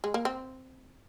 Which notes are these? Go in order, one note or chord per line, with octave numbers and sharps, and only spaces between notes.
G#3
A#3
C4